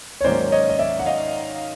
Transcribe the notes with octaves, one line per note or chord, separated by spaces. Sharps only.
C#5
G#2 D#3 F#3 A#3 C#4 C5 D5
C#5 D#5
D#5
D5 E5
F#5
D#5 F5